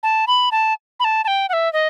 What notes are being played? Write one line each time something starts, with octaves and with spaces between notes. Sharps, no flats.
A5
B5
A5
B5
A5
A5
G5
F#5
E5
D#5